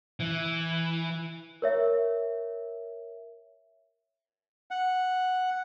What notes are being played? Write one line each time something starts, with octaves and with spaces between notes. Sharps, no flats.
E3
A#4 C#5 E5
F#5